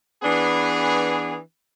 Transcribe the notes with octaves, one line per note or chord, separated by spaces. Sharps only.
E3 B3 D4 G#4